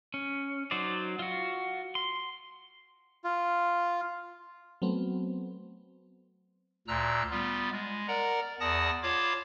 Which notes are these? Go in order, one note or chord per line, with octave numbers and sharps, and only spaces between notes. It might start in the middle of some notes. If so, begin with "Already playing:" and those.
C#4
F#3 D#4 C5 D5
F4 F#4
C6
F4
F#3 A3 B3 C4
D2 A#2 A#5 E6 F#6
G3 B3 F4
G#3
A#4 D5 F#5 A#5
E2 D5 F#5 A5 D#6 A#6
F4 C#5 F5 A5 B5 D6